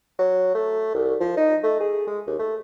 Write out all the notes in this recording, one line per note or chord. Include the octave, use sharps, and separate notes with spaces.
F#3
A3
C2
F3
D#4
A3
G#4
G#3
D#2
A3